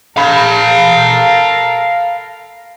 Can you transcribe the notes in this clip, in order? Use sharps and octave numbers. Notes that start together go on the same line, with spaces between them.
A4 A#4 F5 B5